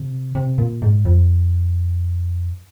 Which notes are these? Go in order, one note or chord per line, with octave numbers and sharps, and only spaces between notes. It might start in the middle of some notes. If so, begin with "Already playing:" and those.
Already playing: C3
C3
A#2
G#2
F2